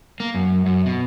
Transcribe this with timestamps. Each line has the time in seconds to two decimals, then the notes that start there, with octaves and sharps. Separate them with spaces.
0.20 A#3
0.35 F#2
0.66 F#2
0.86 B2